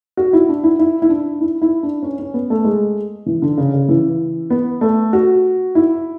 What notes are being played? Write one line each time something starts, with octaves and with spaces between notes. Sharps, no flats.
F#4
E4
D4
E4
E4
E4
D4
E4
E4
D4
C#4
C#4
B3
A3
G#3
E3
D3
C#3
C#3
E3
B3
A3
F#4
E4